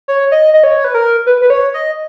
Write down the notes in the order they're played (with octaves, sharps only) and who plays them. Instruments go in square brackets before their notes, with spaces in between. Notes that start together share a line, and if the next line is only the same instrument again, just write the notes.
[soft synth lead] C#5
D#5
D#5
C#5
B4
A#4
B4
B4
C#5
D#5